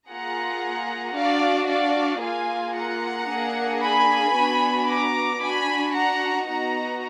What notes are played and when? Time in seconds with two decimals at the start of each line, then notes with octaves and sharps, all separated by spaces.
0.10 A#3 F4 G#4 F#5 A#5
1.17 D4 F#4 D5 F5
1.70 D5 F5
2.22 A#3 F4 G#4 F5 G#5
2.76 F#5 A#5
3.29 A#3 D4 G#4
3.82 G#5 B5
4.36 B3 D4 F#4
4.88 A#5 D6
5.41 D4 F#4 G#5 B5
5.95 F#5 A#5
6.48 B3 D#4 F#4 F#5 A#5